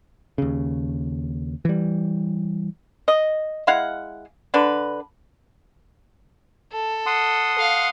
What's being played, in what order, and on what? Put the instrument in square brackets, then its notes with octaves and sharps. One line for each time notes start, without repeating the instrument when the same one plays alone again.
[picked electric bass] D#2 C#3
E3 G3
[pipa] D#5
G#3 E4 F5 F#5
D3 D4 B4
[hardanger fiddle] A4
[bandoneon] F#5 C6 D#6
[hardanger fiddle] F5